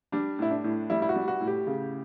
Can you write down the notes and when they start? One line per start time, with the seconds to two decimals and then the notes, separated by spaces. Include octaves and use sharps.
0.12 G3 D4
0.39 A2 E4
0.51 D4
0.64 A2
0.90 G3 E4
1.02 E4
1.09 F#4
1.16 G3
1.28 F#4
1.41 A2
1.47 G4
1.67 C#3